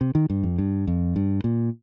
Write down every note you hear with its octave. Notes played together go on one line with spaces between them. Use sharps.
C3
D#3
G2
F2
G2
F2
G2
A#2